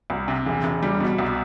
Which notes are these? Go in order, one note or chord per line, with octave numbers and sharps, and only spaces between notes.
C2
C3
E1
E1
G3
B2
C2